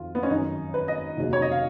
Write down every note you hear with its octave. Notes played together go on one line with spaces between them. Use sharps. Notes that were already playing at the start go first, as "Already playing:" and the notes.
Already playing: F2 D#3 F#3 F4
B3
C#4
G#1 F#2 D#3 D#4
B4
D#5
F1 D#2 C#3 F#3
C#5
D#5
F5